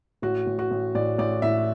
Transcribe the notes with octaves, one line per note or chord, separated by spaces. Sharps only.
A1 F#4
A1
F#4
A1
A1 D5
A1 D5
A2 E5